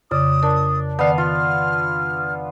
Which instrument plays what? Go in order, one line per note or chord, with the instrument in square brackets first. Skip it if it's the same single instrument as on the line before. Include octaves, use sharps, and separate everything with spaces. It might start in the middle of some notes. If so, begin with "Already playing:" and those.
[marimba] F2 C#3 [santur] D5 [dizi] D#6
[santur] D4 [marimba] A#4
[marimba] D#3 [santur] B3 F5 [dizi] D5
[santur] F4 [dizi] F6